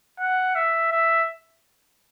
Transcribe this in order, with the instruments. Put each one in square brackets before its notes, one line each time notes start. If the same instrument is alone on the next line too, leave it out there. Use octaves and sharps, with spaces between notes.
[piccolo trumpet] F#5
E5
E5